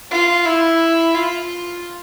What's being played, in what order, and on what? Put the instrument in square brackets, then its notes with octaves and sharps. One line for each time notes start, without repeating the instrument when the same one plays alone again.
[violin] F4
E4
F4